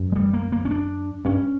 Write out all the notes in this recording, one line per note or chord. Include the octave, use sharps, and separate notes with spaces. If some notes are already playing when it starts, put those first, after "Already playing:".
Already playing: F#2
G#3
G3
A#3
A#3
C#4
D4
G2 C#4